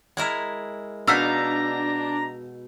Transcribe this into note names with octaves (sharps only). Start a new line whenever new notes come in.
G#3 E4 A#4
B2 D4 D#4 F5 A#5 E6 B6